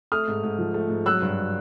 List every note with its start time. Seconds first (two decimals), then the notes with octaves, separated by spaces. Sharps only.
0.12 A3 D#6 F6
0.28 G#2
0.44 G#2
0.59 F3
0.74 A3
0.90 G#2
1.06 F#3 E6 F#6
1.22 G2